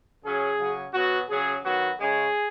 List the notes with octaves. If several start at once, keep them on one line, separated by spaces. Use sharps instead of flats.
C#3 F#3 C#4 G#4
C#3 F#3 C#4
B2 F#3 B3 F#4
C#3 F#3 C#4 G#4
D#3 F#3 B3 F#4
C#3 G#3 C#4 G#4